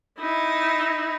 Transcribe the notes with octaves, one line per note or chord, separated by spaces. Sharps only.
D#4 E4